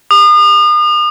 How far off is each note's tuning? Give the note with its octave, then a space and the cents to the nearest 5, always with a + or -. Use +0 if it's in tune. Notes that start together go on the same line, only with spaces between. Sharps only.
D#6 -40